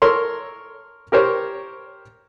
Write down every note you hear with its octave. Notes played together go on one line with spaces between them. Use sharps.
A4 A#4 C#5 C6
G4 A#4 C5 C#5